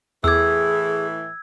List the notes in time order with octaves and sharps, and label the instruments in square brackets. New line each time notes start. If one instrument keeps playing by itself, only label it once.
[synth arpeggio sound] E2 D6 [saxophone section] A2 E3 [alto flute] G#4 [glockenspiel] E6 G#6